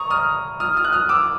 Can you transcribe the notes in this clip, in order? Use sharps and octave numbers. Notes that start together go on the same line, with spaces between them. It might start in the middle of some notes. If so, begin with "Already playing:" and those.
Already playing: A#5 C#6 D#6
D#6 F6
D#6 F6
D#6 F6
F#6
D#6 F6
D6 E6